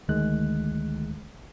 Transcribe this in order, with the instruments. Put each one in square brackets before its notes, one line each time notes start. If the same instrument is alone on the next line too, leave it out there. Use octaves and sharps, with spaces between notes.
[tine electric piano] D2 D#3 G#3 F#6